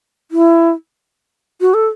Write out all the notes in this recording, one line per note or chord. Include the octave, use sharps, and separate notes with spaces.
E4
F#4
A4